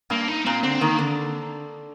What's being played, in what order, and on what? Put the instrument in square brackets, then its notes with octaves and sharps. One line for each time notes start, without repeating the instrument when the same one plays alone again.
[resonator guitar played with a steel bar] G2 [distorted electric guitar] A#3
[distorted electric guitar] D#4
[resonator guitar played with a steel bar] A#2 [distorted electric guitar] C4
[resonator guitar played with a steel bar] D3 [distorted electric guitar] C4
[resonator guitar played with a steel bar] D#3 [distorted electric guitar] A#3
[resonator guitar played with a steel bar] D3